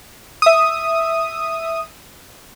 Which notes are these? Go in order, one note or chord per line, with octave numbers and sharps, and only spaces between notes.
E5 D#6